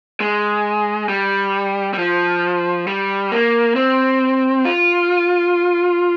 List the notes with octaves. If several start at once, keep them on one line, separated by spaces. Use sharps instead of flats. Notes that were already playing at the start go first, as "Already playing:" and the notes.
G#3
G3
G3
F3
G3
A#3
C4
F4